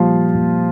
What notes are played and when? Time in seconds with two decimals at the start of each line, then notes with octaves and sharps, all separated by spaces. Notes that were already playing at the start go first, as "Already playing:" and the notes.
Already playing: A#2 F3 G3 F4
0.34 A#2